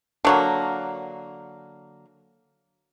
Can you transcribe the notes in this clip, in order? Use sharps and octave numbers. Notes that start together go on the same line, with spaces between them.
D3 F#3 A#3